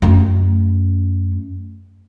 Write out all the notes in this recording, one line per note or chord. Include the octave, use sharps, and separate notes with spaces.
F#2 A3